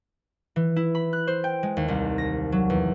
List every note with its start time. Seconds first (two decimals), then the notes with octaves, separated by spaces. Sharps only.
0.56 E3
0.76 E4
0.95 B5
1.13 F#6
1.27 C5
1.44 G5
1.63 G#3
1.77 D#2
1.88 C2
2.18 A#6
2.52 F#3
2.70 E2